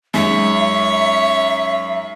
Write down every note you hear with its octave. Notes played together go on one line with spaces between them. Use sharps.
F#2 G#3 D#4 C#5 E5